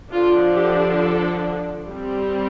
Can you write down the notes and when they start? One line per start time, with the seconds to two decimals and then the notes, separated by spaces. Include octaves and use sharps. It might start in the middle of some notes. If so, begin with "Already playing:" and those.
0.12 D3 F3 D4 F4
0.56 G4
1.00 A4
1.88 G3 C4